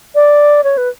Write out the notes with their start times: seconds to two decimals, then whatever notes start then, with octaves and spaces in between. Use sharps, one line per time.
0.15 D5
0.64 C#5
0.77 B4